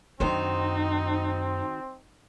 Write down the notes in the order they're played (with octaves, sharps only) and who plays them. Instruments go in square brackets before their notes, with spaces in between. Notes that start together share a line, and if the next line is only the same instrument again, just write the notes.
[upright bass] F#2 D4 [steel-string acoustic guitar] D#3 F#4 C5 [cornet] C4 [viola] D#4